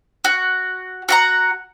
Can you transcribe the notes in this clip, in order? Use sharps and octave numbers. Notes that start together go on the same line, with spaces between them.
F#4
F#4 F#5 A#5